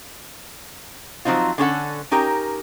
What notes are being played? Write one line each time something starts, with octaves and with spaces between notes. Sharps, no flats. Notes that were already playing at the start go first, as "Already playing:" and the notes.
F3 F#3 C4 D#4 F4
D3 C#4 A4 F#5
C#4 D#4 G4 A#4